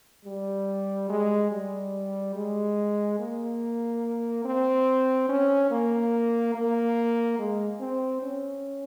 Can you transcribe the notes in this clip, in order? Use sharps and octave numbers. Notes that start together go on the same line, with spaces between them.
G3
G#3
G3
G#3
A#3
C4
C#4
A#3
A#3
G#3
C4
C#4